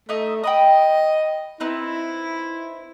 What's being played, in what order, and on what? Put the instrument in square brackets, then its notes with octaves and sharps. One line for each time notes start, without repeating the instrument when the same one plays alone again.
[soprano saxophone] A3 [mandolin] D#4 D#5 E5
[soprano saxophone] D#5 [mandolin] G5 B5 D#6
[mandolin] C4 D#4 B4 [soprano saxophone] E4